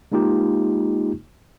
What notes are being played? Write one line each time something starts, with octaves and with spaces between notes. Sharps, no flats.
G#3 A#3 D#4 F4 G4